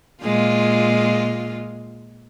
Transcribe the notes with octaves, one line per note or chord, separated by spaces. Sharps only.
A#2 G#3 F4